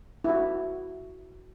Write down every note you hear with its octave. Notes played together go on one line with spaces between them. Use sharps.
E4 F#4